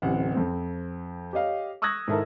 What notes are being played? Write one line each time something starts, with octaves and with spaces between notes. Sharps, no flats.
D1 A1 C3 F#5
F2 C4
G4 C#5 D#5 F5
C#6 D#6 E6 F#6 G#6 A#6
G#2 D#3 E4 A4 A#4